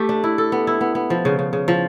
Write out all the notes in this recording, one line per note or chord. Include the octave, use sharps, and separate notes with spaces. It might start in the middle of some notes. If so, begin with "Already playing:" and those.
Already playing: A3 G4
D4
E4
A4
B3
E4
B3
B3
F3
C#3
C#3
C#3
F3